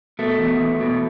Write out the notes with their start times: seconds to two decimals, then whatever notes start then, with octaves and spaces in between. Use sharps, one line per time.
0.19 B2 A3
0.39 E2
0.60 E2
0.80 B2